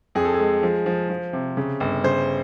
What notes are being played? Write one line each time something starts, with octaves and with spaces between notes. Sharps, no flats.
F2 G#4
A4
G#4
G#3
F3
F3
F3
C3
C#3
G1
C#3 C5